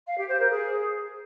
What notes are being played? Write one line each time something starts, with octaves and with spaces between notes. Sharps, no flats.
F5
G4
C5
A#4
G#4